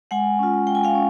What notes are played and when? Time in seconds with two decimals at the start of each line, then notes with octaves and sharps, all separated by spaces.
0.11 G#3 F#5 G#5
0.39 C#4 F4
0.67 G#3 G5
0.75 G#5
0.84 F5 G5
0.95 C#4